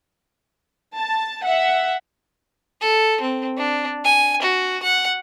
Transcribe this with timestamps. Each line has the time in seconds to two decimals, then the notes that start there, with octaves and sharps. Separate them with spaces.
0.96 A5
1.45 E5 F#5
2.81 A4
3.21 C4
3.57 D4
4.04 G#5
4.42 F#4
4.83 F#5